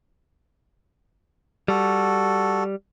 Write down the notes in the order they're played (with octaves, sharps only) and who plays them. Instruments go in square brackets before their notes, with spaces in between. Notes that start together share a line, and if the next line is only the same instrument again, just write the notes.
[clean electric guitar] G3 [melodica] F#4 A4